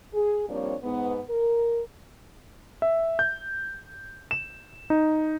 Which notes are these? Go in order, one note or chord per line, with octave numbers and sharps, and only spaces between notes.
G#4
F3 G3 A#3 C4 D4 C#5
G#2 B3
A#4
E5
G6
E7
D#4